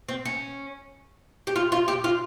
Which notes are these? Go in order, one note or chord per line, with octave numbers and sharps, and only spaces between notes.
C4
C#4
G4
F4
F4
G4
F4